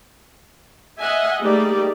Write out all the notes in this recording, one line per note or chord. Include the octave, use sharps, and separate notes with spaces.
D#5 E5 F#5 G#5
G3 A3 A#3 D#4 G#4 D5